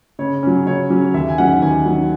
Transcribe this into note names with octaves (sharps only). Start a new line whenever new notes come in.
C#3 C#5
F#3 C#4
C#3 C#5
F#3 C#4
D#2 E5
G#5
D#3 F#3 C#4 F#5
D#2 G#5
D#3 F#3 C#4